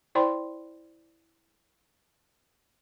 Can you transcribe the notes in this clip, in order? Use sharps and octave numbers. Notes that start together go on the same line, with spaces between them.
E4 C5 D5 G5 B5 C6